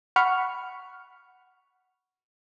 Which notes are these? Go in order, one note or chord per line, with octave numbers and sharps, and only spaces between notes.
F#5 B5 C#6 F6